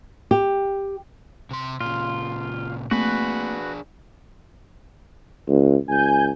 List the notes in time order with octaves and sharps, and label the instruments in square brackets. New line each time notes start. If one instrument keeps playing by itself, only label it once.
[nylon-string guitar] G4
[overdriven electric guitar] C3 C6
[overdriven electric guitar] A#2 C#3 [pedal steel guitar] F4
[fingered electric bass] A3 A#3 C4 [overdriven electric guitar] D4 G#4 [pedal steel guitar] F#4 B4
[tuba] C#2
[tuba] C#2 [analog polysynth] G#5 G6